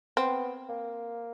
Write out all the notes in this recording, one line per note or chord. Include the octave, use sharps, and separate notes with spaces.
B3 C4
A#3